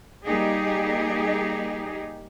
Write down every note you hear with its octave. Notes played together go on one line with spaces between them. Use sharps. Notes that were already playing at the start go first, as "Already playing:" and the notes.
G3 A#3 D#4 G4 G#4 D#5